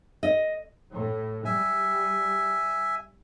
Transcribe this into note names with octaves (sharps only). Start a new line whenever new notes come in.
D#5
A2
G3 E5 G#5